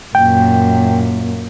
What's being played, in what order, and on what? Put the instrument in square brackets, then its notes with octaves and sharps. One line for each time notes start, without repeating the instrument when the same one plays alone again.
[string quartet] F#2 A#2 [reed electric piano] G5